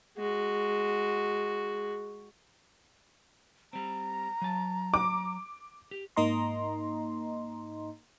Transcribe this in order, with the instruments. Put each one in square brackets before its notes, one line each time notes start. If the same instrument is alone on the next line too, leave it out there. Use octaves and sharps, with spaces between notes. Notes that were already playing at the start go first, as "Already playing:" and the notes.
[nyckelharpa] G#3 F#4
[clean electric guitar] G3 C4 [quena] A#5
[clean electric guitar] F#3 A5
[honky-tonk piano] D6
[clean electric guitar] G4
[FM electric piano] G#2 A#3 D#4 D#5 A#5 C6